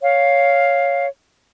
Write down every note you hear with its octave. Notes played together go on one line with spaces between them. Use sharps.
C#5 F5